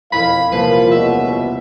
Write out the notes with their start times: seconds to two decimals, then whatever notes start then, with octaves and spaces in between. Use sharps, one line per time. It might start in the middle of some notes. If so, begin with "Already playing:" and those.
0.12 E1 F2 E4 F5 G#5 B5
0.52 C2 A#2 F3 A#3 B4 C7
0.91 C#2 B2 E5